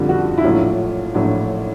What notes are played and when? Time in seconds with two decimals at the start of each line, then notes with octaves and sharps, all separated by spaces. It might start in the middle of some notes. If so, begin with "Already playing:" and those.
Already playing: F2 D3 G3 F4
0.09 F#4
0.38 E4
0.44 A#1 A2 F#3 F4
1.15 A#1 A2 F#3